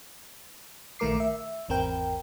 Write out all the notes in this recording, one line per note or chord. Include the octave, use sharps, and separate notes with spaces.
A#1 D#3 A3 A#4 D6 C7
E5
G#1 E2 C4 A#4 G5